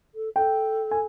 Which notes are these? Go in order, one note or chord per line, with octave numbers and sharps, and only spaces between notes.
A4
A4 G5
G#5